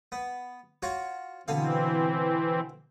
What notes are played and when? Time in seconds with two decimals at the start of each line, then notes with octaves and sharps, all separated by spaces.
0.12 B3
0.83 F4 F#4 C#5
1.48 B2 D3 E3 C4 F5